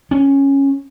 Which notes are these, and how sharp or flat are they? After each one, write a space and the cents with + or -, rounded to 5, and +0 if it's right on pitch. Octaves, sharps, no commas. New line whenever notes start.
C#4 -5